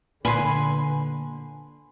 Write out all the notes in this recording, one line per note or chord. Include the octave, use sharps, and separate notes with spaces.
A#2 D3 B4 G#5 C6